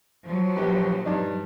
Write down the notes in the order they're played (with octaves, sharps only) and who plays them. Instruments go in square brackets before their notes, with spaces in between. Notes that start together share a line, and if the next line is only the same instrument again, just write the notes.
[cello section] F3 F#3
[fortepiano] A#1 G4 B4
G2 D4 D#4